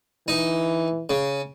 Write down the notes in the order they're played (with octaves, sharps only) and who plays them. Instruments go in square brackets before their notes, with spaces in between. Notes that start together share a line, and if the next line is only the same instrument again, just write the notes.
[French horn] E3 [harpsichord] D#4
[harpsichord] C#3